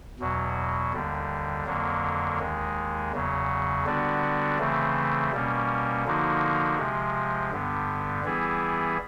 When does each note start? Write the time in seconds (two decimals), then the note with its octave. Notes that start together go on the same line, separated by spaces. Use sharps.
0.20 E2 B2 F#3
0.93 D#2 D3 G3
1.66 F2 D3 F#3 A#3
2.39 D#2 D#3 G#3
3.13 E2 C#3 F#3
3.85 D3 G3 B3 D4 F#4
4.58 C#3 E3 A3 C4
5.32 B2 G3 A#3 C#4
6.05 D3 F3 A#3 D#4 F#4
6.78 C3 F3 G#3
7.51 G2 D3 G3 B3
8.24 E3 G3 B3 E4 G#4